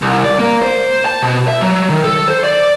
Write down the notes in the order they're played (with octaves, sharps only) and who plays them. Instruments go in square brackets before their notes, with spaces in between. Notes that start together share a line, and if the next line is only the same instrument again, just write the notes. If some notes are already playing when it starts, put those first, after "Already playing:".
[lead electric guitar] C2
D5
A#3
C5
A5
B2
E5
F#3
D#3
A4
C5
D5